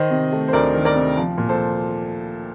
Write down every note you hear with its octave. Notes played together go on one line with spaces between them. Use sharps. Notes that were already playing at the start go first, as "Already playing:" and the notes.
Already playing: D#3 C5 D#5
C3
A3
C5
D2 A#4 D5
D#3
A#4 D5
C3
F3
A#2
A4 C5